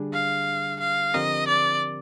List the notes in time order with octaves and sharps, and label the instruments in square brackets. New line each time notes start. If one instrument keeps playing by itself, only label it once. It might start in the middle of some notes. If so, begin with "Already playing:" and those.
Already playing: [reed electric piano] D3 G3 D4 G#4
[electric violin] F5
F5
[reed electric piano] D3 F3 C4 G4 A#4 [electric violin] D#5
[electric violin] D5